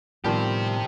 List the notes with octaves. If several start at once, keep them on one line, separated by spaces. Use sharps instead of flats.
A2 D#3 F3 G3 B3 G4 C5